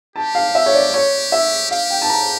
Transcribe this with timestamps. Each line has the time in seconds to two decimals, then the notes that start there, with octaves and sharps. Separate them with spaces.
0.16 G4 A5
0.35 F5
0.55 E5
0.66 C#5
0.74 D5
0.94 C#5
1.32 E5
1.71 G4 F5
1.90 G5
2.02 A5
2.10 A#5